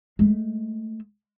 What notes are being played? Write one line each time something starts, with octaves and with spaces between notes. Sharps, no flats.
G#3 A3